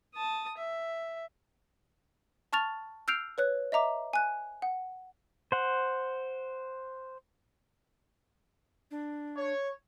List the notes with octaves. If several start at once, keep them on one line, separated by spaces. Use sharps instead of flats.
A5 D#6
E5
A5 C#6 F6 A6 F7
E6 F6 G6 C7 D7 F7
B4 C#5 F#6
D#5 E5 A#5 D6
G#5 F#6
F#5
C5 F#5
D4
C#5